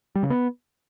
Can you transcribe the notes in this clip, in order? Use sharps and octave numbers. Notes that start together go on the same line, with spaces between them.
G3
C#3
B3